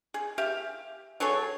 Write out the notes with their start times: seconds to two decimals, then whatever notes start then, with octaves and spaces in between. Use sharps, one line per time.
0.14 G#4
0.38 G4 E5 F5
1.20 F#3 G#4 A4 C#5